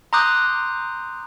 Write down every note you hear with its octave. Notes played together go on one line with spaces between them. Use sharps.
A#5 C6 D6 D#6 F#6 G6